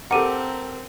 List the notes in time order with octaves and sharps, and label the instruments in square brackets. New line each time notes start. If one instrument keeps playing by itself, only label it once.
[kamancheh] C4 [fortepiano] G4 A#4 [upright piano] A4 D6 [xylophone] F#5 D#7